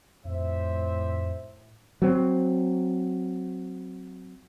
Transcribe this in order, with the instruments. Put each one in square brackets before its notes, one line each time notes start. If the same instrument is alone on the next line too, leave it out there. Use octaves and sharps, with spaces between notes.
[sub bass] F2 [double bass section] A2 [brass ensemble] C5 E5
[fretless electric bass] F#3 C4